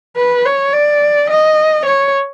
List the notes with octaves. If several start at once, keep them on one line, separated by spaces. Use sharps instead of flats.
B4
C#5
D5
D#5
C#5